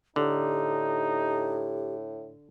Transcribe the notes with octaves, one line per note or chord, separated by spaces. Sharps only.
A2 D3 D#4 G4